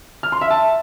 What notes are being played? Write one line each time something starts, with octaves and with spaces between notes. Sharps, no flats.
F6
C6
E5
A5